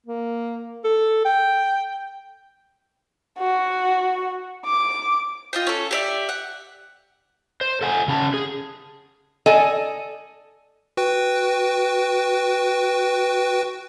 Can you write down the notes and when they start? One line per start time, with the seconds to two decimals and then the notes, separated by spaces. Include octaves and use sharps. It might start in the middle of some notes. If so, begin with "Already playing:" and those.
0.06 A#3
0.84 A4
1.25 G5
3.39 F#4
4.66 D6
5.53 F4 D#5 G5
5.67 C#4 A4
5.91 G4 D5 E5
6.29 F#5
7.61 C5
7.81 A4 F#5 G#5
8.08 C#3 C#4 A5
8.34 G#4
9.46 A4 D5 D#5 G#5
10.97 F#4 B4 G5